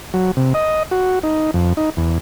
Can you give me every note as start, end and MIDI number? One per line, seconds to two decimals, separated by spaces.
0.14 0.31 54
0.37 0.53 48
0.54 0.83 75
0.91 1.19 66
1.23 1.51 63
1.54 1.73 41
1.77 1.90 63
1.97 2.18 40